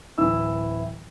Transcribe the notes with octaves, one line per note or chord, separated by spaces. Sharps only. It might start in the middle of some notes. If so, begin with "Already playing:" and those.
D1 E3 E4 E6